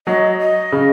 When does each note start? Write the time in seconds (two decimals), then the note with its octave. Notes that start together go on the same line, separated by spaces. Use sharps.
0.07 F#3 D#5
0.39 D#5
0.72 C#3